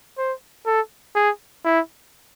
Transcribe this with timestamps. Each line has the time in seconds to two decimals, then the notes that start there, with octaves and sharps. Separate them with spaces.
0.18 C5
0.66 A4
1.15 G#4
1.65 E4